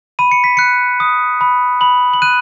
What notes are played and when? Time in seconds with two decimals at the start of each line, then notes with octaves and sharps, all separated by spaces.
0.19 B5 D#7
0.31 C#7
0.44 B6
0.57 F#6 C#7
1.00 D#6
1.41 B5
1.81 B5 F#7
2.13 F#7
2.22 F#6 D#7